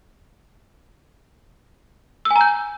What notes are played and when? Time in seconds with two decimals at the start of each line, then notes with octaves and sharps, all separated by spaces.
2.25 E6
2.31 G#5
2.36 A#5
2.41 G6